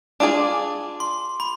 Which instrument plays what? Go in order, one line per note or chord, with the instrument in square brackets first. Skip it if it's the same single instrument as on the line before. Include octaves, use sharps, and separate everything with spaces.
[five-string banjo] D4 F4 G#4 D5 [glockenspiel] D6
[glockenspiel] C6
B5